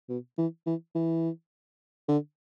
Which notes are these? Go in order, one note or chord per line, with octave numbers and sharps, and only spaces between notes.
B2
E3
E3
E3
D3